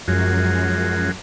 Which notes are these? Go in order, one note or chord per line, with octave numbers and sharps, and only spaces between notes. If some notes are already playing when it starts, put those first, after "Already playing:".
F#2 F3 G#3 F#4